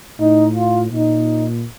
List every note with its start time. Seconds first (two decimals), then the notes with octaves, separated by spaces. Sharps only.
0.19 A2 D#4
0.55 F4
0.92 A#2 D#4